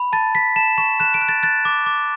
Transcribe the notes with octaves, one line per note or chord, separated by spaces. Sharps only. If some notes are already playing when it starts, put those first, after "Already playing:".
Already playing: B5
A5 A6
A5 B6
A5 E7
C#6 E7
F#6 E7
D7
F#6
A6
F#6 A6
D6
D6